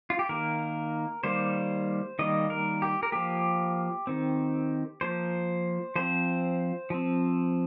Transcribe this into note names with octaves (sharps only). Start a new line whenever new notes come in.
F4
G4
D#3 A#3 A#4
D#3 G3 A#3 C5
D#3 G3 A#3 D#5
A#4
G4
A#4
F3 A#3 G4
D#3 C4
F3 A#3 C5
F3 C4 C5
F3 C4